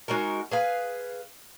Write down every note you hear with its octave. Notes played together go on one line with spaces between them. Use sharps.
G#3 D#4 F#4 A#4
G#4 B4 F5